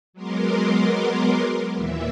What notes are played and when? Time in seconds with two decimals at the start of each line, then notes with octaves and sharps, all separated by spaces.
0.13 F#3 G#3 B3 A#4 C6 D6
1.73 D#2 A#2 E3 E5